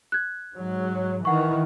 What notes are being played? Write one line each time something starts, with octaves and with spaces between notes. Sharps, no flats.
F#6 G#6
G#2 F#3
D#3 E3 F#5 C#6